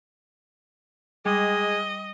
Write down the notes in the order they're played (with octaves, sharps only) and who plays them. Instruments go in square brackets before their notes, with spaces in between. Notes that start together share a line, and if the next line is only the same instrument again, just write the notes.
[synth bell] G3 [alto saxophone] G#3 [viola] D#5